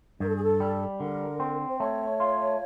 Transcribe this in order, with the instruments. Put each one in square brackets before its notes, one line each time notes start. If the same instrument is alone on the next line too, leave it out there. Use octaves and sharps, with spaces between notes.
[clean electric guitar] G2 [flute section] A#4
[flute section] A4
G#4
A4
[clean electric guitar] G3
[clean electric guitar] D3 [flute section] A#4
[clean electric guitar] C4
[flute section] C5
[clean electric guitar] A3 [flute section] C#5
[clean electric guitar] F4